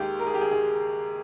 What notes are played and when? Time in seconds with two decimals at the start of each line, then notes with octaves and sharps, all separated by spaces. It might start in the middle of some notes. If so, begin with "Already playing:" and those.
Already playing: D#2 D#3 G#3 G4
0.19 A#4
0.27 G#4
0.34 G4
0.41 G#4
0.51 G#4